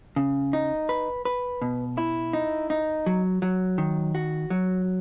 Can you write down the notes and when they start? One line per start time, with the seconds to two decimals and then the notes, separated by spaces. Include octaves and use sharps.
0.16 C#3
0.53 D#4
0.89 B4
1.25 B4
1.62 B2
1.98 E4
2.33 D#4
2.70 D#4
3.06 F#3
3.42 F#3
3.78 D#3
4.15 F#4
4.50 F#3